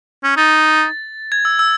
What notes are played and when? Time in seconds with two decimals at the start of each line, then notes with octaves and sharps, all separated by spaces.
0.24 C#4
0.37 D#4 A6
1.32 G#6
1.45 E6
1.59 E6